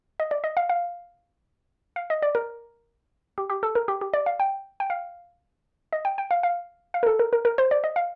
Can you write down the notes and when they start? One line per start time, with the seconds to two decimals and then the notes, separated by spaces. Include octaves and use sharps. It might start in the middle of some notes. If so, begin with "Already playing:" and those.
0.20 D#5
0.31 D5
0.44 D#5
0.57 F5
0.70 F5
1.96 F5
2.10 D#5
2.22 D5
2.35 A#4
3.38 G4
3.50 G4
3.63 A4
3.75 A#4
3.88 G4
4.01 G4
4.14 D5
4.26 F5
4.40 G5
4.80 G5
4.90 F5
5.93 D#5
6.05 G5
6.18 G5
6.31 F5
6.43 F5
6.94 F5
7.03 A#4
7.07 A4
7.19 A#4
7.33 A#4
7.45 A#4
7.58 C5
7.71 D5
7.84 D#5
7.96 F5